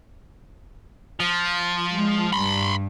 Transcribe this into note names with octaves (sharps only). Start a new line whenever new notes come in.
F3
G#3
G2 B5 C6